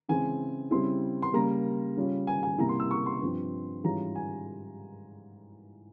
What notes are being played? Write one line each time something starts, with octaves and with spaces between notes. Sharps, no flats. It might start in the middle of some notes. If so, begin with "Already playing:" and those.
C#3 E3 G#3 C4 G#5
C#3 G3 C4 E4 C6
C6
C#3 G3 A#3 A#5
C#3 G3 C#4 F4
G#5
G#5
C3 G3 A#3 E4 A#5
C6
E6
C#6
C6
G2 F3 C4
G#2 E3 G3 C#4 F4 A#5
G#5